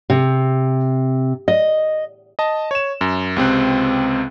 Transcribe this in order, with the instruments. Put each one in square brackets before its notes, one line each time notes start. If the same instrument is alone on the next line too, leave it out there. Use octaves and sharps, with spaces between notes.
[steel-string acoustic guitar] C3
D#5
[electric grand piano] D#5 A5
C#5 E7
F#2
C#2 C3 C4 F#6